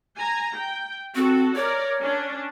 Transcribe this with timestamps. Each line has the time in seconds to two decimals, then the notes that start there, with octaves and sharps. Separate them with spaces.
0.18 G#5 A#5
0.54 G5
1.15 C4 F#4 A4
1.56 A#4 C#5 D5
2.00 C#4 D4